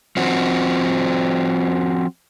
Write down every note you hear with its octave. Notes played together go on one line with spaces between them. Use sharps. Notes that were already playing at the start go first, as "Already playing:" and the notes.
F3 C4 F#4